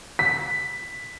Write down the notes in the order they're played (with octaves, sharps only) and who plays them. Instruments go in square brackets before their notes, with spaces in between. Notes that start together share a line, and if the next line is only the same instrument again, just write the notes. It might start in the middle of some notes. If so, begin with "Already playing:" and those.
[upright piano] B6